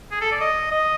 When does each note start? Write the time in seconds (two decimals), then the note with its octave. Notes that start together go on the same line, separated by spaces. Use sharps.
0.11 G#4
0.21 A4
0.32 D5
0.41 D#5
0.72 D#5